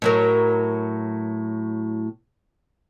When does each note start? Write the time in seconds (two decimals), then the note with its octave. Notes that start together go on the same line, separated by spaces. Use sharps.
0.02 A2 F#3 A#4